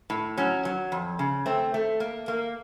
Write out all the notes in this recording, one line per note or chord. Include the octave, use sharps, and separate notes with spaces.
A2
F#3 C#4
F#3
F2
C#3
A3 C4
A3
A#3
A#3